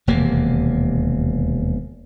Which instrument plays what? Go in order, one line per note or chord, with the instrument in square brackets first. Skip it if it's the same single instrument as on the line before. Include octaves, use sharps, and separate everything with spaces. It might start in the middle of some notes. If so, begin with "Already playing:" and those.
[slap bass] E1 D#2 C3 A#3